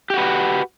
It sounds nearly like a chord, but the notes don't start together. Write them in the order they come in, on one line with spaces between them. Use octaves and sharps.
G4 F#4 B4